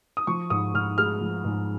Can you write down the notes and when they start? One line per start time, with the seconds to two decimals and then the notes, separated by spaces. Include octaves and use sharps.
0.17 D#6
0.27 F3 C#6
0.50 G#2 D#6
0.74 G#2 F6
0.98 G#3 F6
1.21 F3
1.45 G#2